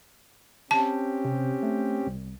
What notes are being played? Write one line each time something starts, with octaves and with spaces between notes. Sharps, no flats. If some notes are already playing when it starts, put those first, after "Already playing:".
C4 C#4 G4 A5
C3
A3
C2